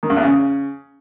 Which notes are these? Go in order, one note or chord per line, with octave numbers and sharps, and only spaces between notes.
D#3
G2
E2
C#3